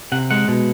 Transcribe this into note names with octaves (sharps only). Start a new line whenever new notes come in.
C3 F#5
G#3 F#5
B2